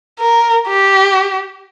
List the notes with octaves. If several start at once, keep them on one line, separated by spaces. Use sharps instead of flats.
A#4
G4